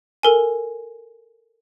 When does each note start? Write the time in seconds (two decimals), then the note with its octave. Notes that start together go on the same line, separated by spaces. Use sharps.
0.23 A4 A#4 G#5